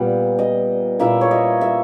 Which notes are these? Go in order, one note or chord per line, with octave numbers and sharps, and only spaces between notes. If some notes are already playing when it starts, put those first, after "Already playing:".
Already playing: A#2 G3 B3
D#5
A#2 A#3 E4 E5
C#5
D#5
E5